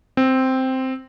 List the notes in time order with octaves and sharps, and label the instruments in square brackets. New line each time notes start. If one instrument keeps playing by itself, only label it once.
[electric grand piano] C4